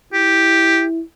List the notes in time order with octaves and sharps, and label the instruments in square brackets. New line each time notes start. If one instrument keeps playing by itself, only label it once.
[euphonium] E4 [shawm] G4